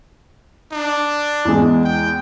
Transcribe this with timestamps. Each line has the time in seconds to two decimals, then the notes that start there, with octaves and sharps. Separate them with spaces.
0.72 D4
1.45 E2 G#3
1.84 G5